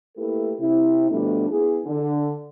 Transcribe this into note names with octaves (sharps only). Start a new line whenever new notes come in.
A3 A#3 E4 G4 A4 B4
C3 E4
B2 F3 G3 A3 B3 D4
B3 E4 G#4
D3